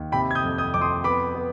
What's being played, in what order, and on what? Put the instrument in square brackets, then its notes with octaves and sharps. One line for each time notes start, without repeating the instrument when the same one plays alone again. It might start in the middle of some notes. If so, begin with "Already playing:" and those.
Already playing: [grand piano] D#2
C3 G5 B5
G#6
D#6 G6
F2
D#6 G6
F2 D6
C6 D#6
B3 B5 D6
B3